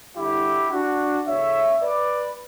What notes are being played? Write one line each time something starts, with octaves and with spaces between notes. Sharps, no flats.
G2 D3 E4 G4
D4 F#4
E2 D3 C#5 E5
B4 D5